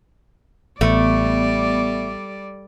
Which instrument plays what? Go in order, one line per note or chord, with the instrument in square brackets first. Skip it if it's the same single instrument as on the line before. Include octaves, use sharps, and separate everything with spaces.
[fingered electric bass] A1 [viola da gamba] G3 D5 [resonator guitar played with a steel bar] A3 [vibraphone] B3